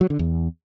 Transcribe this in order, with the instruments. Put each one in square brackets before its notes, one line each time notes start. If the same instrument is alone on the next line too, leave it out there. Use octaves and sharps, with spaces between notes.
[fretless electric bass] F#3
D3
E2